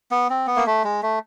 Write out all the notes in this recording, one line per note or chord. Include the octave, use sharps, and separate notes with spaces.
B3
C4
B3
A#3
A3
G#3
A3